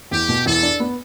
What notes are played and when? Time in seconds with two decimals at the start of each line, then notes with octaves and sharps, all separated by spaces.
0.11 E2 G4
0.29 B2
0.46 E2 A4
0.63 D4
0.80 B3